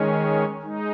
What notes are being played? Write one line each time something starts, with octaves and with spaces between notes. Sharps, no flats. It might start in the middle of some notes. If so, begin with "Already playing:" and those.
Already playing: D#3 G#3 C#4
G#3 D#4